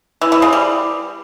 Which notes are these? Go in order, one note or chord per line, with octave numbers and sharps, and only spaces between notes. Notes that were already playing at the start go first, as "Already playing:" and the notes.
E3
E3
C#3
G3